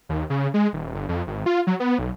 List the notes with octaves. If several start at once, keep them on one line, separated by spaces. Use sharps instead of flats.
D#2
C#3
G#3
D#1
G1
F2
G#1
F4
F#3
B3
B1